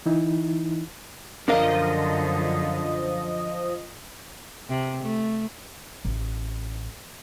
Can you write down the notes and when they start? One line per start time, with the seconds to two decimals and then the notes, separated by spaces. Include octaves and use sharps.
0.06 E3 D#4 E4
1.48 F#2 D3 F3 D4 A#4 D#5 F5
4.69 C3
5.04 A3
6.05 A1